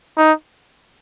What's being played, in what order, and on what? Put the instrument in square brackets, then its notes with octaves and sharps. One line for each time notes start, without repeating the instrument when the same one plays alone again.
[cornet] D#4